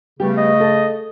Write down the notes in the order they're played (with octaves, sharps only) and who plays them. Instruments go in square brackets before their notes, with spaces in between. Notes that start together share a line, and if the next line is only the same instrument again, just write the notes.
[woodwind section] C#3 A3 [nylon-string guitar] G3 B3 G4
[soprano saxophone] D#5
[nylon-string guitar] A4